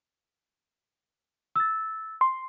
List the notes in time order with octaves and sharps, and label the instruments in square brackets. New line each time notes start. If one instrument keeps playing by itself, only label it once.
[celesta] E6 A6
[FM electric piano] C6